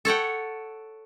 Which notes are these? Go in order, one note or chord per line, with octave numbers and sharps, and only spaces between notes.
A4 C#5 F#5 G5